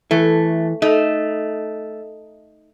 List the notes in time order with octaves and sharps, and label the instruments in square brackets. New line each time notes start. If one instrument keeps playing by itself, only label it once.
[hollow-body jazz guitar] E3 [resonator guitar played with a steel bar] A3
[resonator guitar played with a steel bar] A3 [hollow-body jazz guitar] D#4